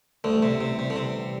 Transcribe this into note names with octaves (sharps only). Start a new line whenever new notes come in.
A1 D2 A2 D3 E3 G3
C3
C3
C3
D3
C3